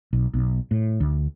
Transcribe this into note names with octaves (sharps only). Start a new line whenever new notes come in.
B1
B1
A2
D2